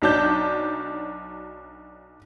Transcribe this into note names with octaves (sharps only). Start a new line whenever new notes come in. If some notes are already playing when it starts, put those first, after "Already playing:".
B1 F#3 D4 A5 G6